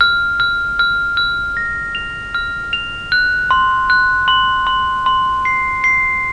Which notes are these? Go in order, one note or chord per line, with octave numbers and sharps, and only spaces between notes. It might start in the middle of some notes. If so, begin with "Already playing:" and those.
F6
F6
F6
F6
A#6
F7
F6
F7
F#6
C6
F#6
C6
C6
C6
C7
C7